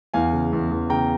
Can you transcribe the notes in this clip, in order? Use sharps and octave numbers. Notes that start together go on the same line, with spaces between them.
E2 F5 G#5
C#3
E2
E2
C#3 G5 A#5